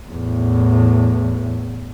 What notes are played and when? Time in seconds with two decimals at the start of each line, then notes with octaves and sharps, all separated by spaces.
0.11 E2 A2